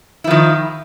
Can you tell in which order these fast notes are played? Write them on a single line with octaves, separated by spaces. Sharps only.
E4 F3 D#3